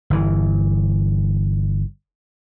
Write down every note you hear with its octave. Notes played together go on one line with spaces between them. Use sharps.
G1 E3